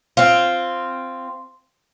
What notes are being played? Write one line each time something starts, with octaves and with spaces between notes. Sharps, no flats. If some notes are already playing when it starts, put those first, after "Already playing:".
C4 F4